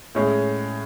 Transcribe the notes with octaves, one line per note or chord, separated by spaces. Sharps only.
A2 G#3 C#4